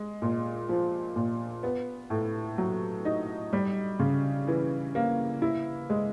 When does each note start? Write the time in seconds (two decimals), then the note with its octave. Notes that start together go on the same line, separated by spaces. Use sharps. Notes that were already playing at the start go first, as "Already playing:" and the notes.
Already playing: G#3
0.22 A#2
0.69 F3
1.16 A#2
1.63 B3
2.10 A2
2.58 F#3
3.05 D#4
3.53 G3
3.99 C#3
4.47 E3
4.95 A#3
5.42 E4
5.90 G#3